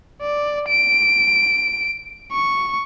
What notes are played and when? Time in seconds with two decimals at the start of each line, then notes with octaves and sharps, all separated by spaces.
0.22 D5
0.69 D7
2.32 C#6